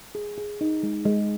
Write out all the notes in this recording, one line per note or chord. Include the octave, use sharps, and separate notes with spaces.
G#4
G#4
D#4
G#3
G#3